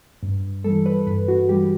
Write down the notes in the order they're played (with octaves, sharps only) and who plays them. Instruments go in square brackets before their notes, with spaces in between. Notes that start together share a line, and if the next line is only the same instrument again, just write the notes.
[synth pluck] G2
E3 G3 A4
B4
G2 B4
F#4
E3 G3 G4